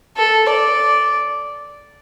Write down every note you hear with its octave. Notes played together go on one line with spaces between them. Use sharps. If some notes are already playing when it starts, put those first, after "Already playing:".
A4
D5